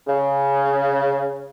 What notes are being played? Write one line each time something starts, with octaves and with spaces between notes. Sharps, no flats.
C#3